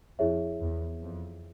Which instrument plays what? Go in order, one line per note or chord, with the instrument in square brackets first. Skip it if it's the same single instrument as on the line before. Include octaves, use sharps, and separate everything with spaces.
[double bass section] F2 [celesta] E4 G#4 C#5 E5
[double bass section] E2
F2